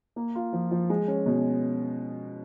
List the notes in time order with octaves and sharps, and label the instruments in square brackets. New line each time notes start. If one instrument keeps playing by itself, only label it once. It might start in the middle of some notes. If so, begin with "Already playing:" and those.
[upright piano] A#3
F4
F3
F3
G#3
C#4
B2